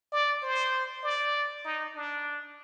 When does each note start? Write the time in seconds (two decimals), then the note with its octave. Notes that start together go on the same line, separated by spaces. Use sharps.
0.12 D5
0.42 C5
1.03 D5
1.65 D#4
1.95 D4